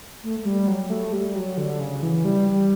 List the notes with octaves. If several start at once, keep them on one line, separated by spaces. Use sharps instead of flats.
A3
A3
G3
F#3
A3
G3
F#3
D3
C#3
E3
G3
G3